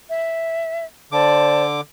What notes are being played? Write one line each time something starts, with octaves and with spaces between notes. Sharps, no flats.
E5
D3 C5 D5 A5 D6